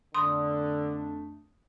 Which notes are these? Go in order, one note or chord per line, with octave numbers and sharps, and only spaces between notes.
F2 D3 A3 D4 C6 D#6